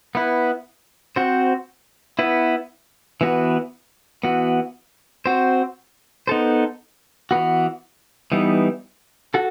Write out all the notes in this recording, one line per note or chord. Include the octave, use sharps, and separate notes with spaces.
B3 E4 B4
C4 F#4 C5
B3 E4 B4
E3 B3 F#4 B4
E3 B3 F#4
C4 F#4 C5
B3 D#4 A4 C5
E3 B3 F#4
E3 G3 B3 D#4
F#4 A4